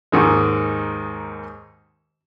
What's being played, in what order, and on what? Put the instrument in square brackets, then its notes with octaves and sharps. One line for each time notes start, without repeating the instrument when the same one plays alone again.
[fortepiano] D#2 G#2 D#3 G#3